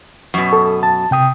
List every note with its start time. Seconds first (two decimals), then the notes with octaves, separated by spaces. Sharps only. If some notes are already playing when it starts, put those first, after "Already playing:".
0.34 F#2 B2
0.53 A4
0.83 A5
1.11 C3 G5 D#6